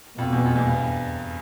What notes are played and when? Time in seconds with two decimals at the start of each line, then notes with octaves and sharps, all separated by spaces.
0.17 F2 B2
0.33 E2
0.46 F2
0.55 E2
0.65 G2